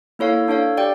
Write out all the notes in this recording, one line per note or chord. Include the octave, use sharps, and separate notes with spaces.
A#3 E4 A4 C#5 F5
D4 A4 C#5 F5
G4 D5 G5